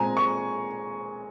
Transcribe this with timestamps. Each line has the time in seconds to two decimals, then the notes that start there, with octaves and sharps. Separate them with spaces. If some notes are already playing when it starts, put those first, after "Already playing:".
Already playing: A#2 G#3 C4 G#5 A#5
0.17 C#6